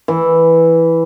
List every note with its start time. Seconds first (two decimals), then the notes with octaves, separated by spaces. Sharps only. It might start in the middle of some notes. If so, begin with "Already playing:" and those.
0.08 E3